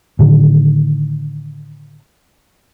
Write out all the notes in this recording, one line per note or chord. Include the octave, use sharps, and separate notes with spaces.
A2 D3 D#3